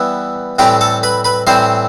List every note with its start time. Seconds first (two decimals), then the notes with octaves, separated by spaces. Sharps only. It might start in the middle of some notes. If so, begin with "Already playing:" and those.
Already playing: E3 G3 B3 E4 E5
0.59 A2 E3 G3 C4 E4 G4 G5
0.81 A4 A5
1.03 B4 B5
1.24 B4 B5
1.47 A2 E3 G3 C4 E4 C5 C6